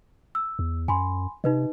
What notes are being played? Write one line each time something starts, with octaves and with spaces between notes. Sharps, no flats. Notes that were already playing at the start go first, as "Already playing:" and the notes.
E6
E2
F#2 G#5 B5 C6
C3 D#4 B4 D#5